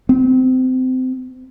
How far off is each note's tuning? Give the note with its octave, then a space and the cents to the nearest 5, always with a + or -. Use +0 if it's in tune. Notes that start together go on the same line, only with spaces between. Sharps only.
C4 -25